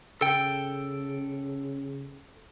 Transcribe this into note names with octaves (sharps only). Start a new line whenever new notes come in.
C#3 A4 G5